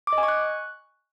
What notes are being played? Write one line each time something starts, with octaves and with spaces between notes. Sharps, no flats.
D6
D#5
G#5
C#6
F#6